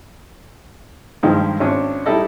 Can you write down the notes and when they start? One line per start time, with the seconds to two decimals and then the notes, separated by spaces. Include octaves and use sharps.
1.23 G2 D#3 F3 G#3
1.60 G#1 C#4 D4
2.06 G3 D#4 E4 A4 D#5